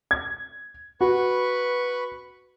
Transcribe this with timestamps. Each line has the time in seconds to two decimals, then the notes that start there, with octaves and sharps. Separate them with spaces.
0.11 G#6
1.01 F#4 B4 B5 C#6